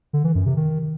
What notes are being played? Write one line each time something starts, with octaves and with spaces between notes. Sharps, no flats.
D3
E3
F#2
C3
D#3